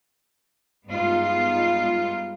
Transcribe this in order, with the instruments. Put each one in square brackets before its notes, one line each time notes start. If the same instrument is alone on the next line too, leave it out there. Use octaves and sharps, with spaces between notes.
[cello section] G2 G#3 B3 D#4 F4